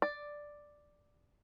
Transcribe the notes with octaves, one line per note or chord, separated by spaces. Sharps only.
D5